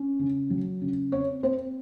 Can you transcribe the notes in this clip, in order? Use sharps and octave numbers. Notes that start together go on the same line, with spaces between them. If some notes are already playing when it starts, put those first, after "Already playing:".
Already playing: C#4
C#3
F#3
C#3
C4 C#5
C4 C5